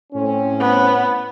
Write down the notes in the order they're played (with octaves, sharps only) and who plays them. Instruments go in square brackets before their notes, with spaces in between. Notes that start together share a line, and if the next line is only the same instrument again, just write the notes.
[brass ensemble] A2 C4 C#4
[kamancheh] B3